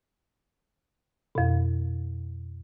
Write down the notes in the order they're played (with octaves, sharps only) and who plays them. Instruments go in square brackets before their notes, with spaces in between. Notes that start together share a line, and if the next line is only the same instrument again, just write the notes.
[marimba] F2 B2